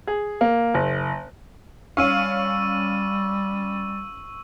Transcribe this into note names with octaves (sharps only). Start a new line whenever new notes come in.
G#4
A#3
F#1
G3 C#4 F5 C#6 E6 D#7